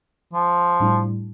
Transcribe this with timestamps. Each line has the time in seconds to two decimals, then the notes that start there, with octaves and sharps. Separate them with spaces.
0.33 F3
0.80 A2 G3 D4